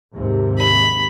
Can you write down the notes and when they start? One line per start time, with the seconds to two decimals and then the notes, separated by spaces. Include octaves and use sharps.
0.15 D#2 G#2 C3
0.58 B5